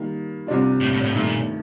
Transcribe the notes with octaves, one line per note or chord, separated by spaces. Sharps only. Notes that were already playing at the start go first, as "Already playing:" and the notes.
Already playing: D#3 G3 A#3
C2 C3 G3 D4 F4
A2
A2
A2
G2 A#2 D#3 A3